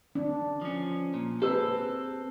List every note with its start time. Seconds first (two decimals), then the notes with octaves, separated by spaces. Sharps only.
0.15 D4
0.61 F3 C#4
1.14 A#2
1.42 C4 G#4 A4 B4 E6